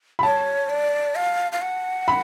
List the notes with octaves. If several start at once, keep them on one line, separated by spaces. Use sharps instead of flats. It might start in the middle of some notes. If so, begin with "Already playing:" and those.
B5
C#5 A5
D5
F5
F5
F#5
B5